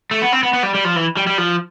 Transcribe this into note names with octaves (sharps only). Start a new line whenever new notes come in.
A3
B3
C4
B3
B3
G3
G3
F3
E3
G3
G3
F3